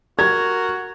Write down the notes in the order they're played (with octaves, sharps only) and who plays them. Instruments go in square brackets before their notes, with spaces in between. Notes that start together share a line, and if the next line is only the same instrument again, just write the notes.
[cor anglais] F#4 [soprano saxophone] A#4 [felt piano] G#6